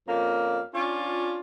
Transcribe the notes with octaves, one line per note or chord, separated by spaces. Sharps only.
F2 A#3 C#4 F5
C#4 D4 F4